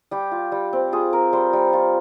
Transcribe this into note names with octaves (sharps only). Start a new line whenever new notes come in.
G3 G4
F4
G3
C4
F4 G#4
C4 A#4
G3 C5
G3
F4